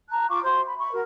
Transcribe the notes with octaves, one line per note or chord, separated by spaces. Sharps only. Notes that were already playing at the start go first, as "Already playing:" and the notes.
A5 A#5 F#6
F4 F5 C#6 D6
F#4 C5 E5 C6
B5
E5 B5 C#6
F#4 A#4